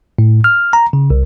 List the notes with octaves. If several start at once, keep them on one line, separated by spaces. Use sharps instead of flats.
A2
F6
A#5
C#3
C2